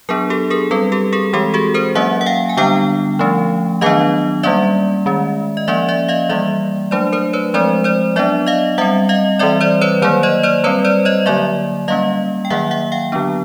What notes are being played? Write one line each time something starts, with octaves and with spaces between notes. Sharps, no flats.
F#3 B3 D4 G#4 A#4
G4 A4
G#4 A#4
G3 C4 A4 B4
G4 A4
G#4 A#4
E3 G#3 C4 G4 A4
F#4 G#4
A#4 C5
F#3 A#3 C#4 E5 F#5
F#5
F5 G5
G#5
D3 G3 B3 D4 F5 G5
F3 A3 C#4
D#3 F#3 B3 D4 D#5 F5
G3 A#3 C#4 D5 E5
D#3 G#3 C#4
D#5
F3 A#3 C#4 D5 E5
D5 E5
D#5 F5
E3 G3 A#3 D5 E5
F#3 A3 D4 C5 D5
A#4 C5
B4 C#5
F3 G#3 C4 C5 D5
C5 D5
F#3 B3 D4 D5 E5
D#5 F5
G3 C4 E5 F#5
D#5 F5
E3 G3 C4 D5 E5
C5 D5
B4 C#5
D#3 F#3 A#3 C5 D5
C#5 D#5
C5 D5
G3 C4 B4 C#5
C5 D5
C#5 D#5
D3 F#3 A#3 D5 E5
G3 A#3 C#4 D#5 F5
G5
D#3 F#3 A#3 E5 F#5
E5 F#5
F5 G5
D3 F#3 B3 D4